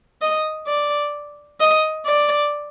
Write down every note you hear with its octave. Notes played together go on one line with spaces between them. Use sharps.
D#5
D5
D#5
D5